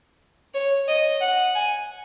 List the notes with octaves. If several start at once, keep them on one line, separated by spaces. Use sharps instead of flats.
C#5
D#5
F#5
G#5